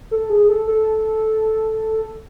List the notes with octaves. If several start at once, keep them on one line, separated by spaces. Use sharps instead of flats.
A4
G#4
A4
A4